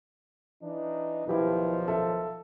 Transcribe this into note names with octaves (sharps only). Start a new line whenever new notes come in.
E3 D4 D#4
B1 D#3 F3 E4 G4 B4
A4 E5